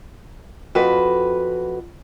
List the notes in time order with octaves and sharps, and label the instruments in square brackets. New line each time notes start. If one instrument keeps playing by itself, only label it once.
[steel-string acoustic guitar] F2 F#4 B4